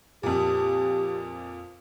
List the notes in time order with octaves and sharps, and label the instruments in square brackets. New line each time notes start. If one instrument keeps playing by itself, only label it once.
[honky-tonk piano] F2 A#2 [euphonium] G4